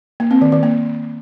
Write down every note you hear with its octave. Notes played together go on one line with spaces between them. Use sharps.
A#3
C4
D#3
D#3
A#3